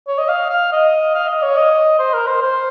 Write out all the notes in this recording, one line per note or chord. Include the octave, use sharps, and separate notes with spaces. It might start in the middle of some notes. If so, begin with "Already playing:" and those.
C#5
D#5
F5
F5
D#5
F5
D#5
C#5
D#5
C5
A#4
C5
C5